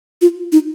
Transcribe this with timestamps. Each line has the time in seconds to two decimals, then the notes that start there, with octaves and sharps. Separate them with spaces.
0.21 F4
0.52 D#4